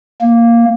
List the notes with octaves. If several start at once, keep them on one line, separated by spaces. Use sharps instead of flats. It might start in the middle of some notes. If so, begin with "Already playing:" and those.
A#3